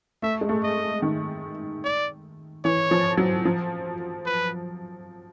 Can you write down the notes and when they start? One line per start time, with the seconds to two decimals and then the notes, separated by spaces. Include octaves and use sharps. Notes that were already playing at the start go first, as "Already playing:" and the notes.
0.22 A3 E5
0.41 G#3
0.49 A3
0.63 D#5
1.02 D#3
1.84 D5
2.65 E3 C#5
2.91 F3
3.17 F#3
3.45 F3
4.26 B4